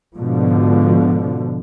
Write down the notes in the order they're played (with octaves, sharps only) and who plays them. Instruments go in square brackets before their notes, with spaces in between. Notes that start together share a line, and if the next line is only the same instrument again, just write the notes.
[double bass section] G#2 B2 D3 F3